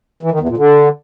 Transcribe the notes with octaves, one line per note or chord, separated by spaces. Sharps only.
E3
D#3
E2
A#2
D3